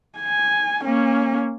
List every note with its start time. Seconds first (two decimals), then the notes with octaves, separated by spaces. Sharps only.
0.19 G#5
0.85 A#3 C#4